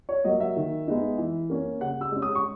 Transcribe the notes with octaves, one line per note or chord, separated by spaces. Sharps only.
C#5
F#3 A#3 D#5
E5
D#3
G#3 B3 D#4
E3
A#3 C#4
C#3 F#5
E6
G#3 C#4
D#6
C#6